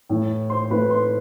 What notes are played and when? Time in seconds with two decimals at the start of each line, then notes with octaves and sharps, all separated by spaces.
0.09 A2 E3 A3
0.50 C5 C6
0.70 A2 E3 A3 B4 B5
0.90 C5 C6